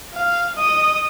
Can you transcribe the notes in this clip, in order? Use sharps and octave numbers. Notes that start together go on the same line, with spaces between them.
F5
D#5 D#6